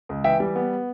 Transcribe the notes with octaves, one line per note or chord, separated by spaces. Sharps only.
C#2
E3 E5 G5
G3
B3